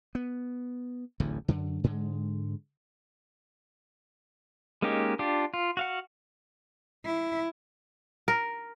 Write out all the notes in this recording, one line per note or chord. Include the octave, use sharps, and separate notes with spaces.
B3
D1 A1 E2 D3
F#2 D3
G#2 D3 G#3
G#3 A#3 C#4 D#4 G4
D4 F4 G4
F4
F#4 F5 F#5
E4
A#4